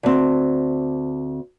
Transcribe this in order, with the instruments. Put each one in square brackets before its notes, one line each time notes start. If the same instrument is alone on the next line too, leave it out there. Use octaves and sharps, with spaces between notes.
[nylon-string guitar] D2 C4